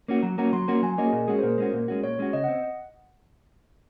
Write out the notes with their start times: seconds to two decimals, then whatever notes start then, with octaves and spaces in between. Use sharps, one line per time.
0.08 A#3 C#4 F#4
0.22 F#3 A#5
0.38 A#3 C#4 F#4 A#5
0.53 F#3 C6
0.68 A#3 C#4 F#4 A#5
0.83 F#3 G#5
0.98 A#3 C#4 F#4 D#5
1.06 G#4
1.13 A#2 A#4
1.28 G#3 C#4 F#4 G#4
1.39 C5
1.43 A#2 A#4
1.58 G#3 C#4 F#4
1.73 A#2
1.88 G#3 C#4 F#4
2.03 A#2 C#5
2.19 G#3 C#4 F#4
2.33 C#3 D#5
2.44 F#5
2.48 C4